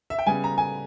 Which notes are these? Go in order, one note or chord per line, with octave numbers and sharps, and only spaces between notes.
E5
G5
C#3 G3 B3 G#5
A#5
G#5